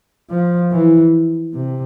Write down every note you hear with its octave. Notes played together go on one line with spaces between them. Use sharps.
F3
E3
C3